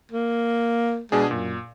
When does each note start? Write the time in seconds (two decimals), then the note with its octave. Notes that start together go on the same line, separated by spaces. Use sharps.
0.12 A#3
1.12 B2 G#3 D4 G#4
1.31 F#2 A#2